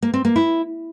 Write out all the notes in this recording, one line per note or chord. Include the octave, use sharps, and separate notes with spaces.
A#3
C4
A#3
E4